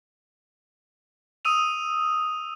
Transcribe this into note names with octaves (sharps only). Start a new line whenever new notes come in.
D#6 E6 D#7 F7